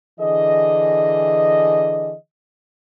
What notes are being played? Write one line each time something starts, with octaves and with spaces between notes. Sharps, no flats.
D3 E3 G#4 D#5